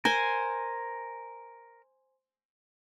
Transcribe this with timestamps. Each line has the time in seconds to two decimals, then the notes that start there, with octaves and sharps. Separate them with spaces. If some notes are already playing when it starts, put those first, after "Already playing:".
0.05 A#4 C5 G#5